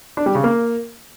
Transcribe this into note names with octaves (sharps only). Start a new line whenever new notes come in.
D4
G3
C#3
A#3